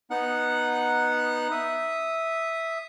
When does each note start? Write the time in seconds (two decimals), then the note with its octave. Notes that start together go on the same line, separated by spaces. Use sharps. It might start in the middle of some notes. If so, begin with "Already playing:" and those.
0.11 B3 D#4 F#5 F#6
1.51 E5 D#6